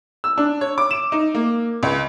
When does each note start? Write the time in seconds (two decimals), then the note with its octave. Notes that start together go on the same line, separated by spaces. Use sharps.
0.24 E6
0.38 D4
0.61 C#5
0.78 D6
0.91 E7
1.12 D#4
1.34 A#3
1.83 C#2